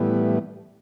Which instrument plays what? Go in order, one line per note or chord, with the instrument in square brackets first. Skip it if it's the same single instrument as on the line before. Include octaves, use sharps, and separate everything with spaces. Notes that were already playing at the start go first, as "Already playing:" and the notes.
Already playing: [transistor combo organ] A2 E3 G3 B3